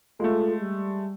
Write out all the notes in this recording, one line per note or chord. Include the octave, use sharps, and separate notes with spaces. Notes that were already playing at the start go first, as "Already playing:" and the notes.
G#3 A3 F4 A4
G3